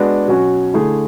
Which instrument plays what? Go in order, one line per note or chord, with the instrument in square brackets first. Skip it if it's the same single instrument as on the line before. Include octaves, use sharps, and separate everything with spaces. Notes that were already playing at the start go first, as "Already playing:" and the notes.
Already playing: [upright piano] G#3 B3 D4 F#4
B2 F#3 C#4 F#4
D3 A3 E4 G#4